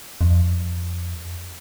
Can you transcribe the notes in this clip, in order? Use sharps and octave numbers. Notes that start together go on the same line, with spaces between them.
F2